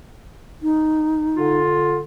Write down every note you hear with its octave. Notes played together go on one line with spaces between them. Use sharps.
D#4
D3 F4